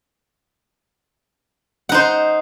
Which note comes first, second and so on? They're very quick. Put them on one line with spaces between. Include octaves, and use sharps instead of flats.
F#5 D#4 C5